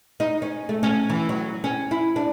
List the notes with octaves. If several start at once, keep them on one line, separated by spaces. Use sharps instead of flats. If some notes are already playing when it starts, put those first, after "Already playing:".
D#4
C#4
A3
C#4
E3
F#3
C#4
E4
D4